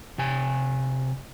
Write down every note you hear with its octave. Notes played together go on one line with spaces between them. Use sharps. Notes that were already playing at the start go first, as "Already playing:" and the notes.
C3 G#5